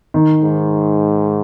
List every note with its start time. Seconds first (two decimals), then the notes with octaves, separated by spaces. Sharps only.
0.14 D#3
0.42 G#2